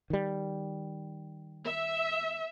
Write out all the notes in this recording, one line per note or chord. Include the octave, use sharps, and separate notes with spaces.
D#3 G3
E5